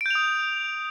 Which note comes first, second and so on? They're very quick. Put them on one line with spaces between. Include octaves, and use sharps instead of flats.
D7 G6 F7 D#6